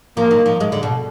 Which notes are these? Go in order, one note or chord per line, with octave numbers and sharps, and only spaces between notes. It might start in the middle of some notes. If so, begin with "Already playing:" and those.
F3 A#3
D#3
F3
G#3
D3
B2